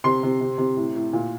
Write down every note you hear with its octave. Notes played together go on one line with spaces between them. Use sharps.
C3 C6
C3
C3
C3
A2
A2
A#2